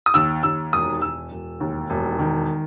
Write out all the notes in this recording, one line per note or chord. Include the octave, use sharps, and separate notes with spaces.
D#6
D#2 E6
D#2 E6
E1 D#6
E1 E6
E1
D#2
E1
D#3